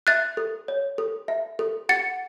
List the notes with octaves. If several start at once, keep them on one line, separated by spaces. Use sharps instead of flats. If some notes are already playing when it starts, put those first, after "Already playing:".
E5 F#6 A6
A4
C#5
A4
E5
A4
F#5 A6 C#7